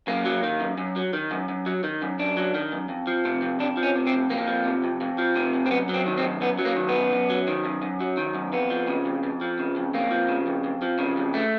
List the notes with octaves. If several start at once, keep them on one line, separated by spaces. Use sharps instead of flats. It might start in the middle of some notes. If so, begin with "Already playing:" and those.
F#2 A#3
F#3
D#3
F#2
F#2
F#3
D#3
F#2
F#2
F#3
D#3
F#2
F#2 D4
F#3
D#3
F#2
F2
F3
C3
F2
F2 D4
F3
C#4
C3
C4
F2
F2 A#3
F3
C3
F2
F2
F3
C3
F2
C4
F#2 B3
F#3
C4
D#3
C4
F#2
F#2 B3
F#3
A#3
D#3
B3
F#2
F#2
F#3
D#3
F#2
F#2
F#3
D#3
F#2
F2 B3
F3
C#3
F2
F2
F3
C#3
F2
F2 A#3
F3
C#3
F2
F2
F3
C#3
F2
A3